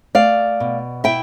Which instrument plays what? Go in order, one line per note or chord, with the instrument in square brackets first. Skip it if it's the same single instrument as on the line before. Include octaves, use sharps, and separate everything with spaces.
[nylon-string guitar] A3 D5 F5
B2
E4 E5 G5